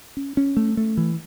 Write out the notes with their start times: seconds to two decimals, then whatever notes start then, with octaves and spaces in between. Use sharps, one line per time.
0.17 C#4
0.37 C#4
0.57 A3
0.77 A3
0.97 E3